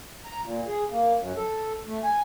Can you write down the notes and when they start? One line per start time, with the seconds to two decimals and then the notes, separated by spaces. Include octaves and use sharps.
0.24 A#5
0.44 A#2
0.68 G#4
0.91 A#3
1.18 F#2
1.37 A4
1.86 A3
2.04 G#5